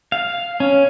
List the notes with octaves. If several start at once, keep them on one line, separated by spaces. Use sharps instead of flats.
F5
C#4